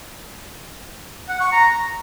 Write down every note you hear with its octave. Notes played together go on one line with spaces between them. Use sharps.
F#5
C#6
A#5